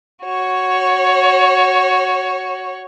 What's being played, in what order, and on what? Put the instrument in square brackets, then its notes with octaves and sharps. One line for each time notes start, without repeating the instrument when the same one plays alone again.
[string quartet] F#4 C#5